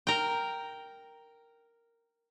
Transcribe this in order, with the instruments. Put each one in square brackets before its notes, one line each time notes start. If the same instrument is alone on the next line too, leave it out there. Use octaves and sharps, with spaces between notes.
[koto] A#4 G5